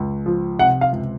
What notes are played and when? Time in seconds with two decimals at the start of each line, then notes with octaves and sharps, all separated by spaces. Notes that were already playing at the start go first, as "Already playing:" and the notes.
Already playing: C#2
0.26 F3
0.59 C3 F#5
0.81 F5
0.93 C#2